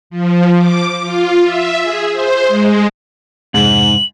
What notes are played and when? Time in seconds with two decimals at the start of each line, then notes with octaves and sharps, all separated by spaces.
0.10 F3
0.57 D6
1.01 F4
1.43 E5
1.82 G#4
2.12 C5
2.48 G#3
3.54 F2 G#2 C3 G#3 F#7